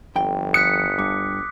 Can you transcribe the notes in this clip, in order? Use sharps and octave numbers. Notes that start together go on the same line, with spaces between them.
G1 F2 G5
D#6 F#6 B6 C#7
G2 D6